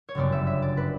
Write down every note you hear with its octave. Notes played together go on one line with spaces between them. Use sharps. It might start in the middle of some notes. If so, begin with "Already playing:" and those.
C#5
G1 F#2 C#3 G3 B3 D5
E5
E5
D5
B4